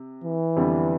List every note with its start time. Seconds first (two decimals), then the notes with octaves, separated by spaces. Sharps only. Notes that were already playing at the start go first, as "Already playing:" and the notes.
Already playing: C3
0.24 E3
0.57 F2 D3 G3 B3